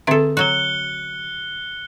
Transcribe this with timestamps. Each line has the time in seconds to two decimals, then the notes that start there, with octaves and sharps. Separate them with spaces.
0.07 D3 C4 G#4 A4 E5
0.37 F#3 F#4 F#6 C#7 G7